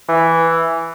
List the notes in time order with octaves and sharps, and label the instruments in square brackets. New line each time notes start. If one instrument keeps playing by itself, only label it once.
[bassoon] E3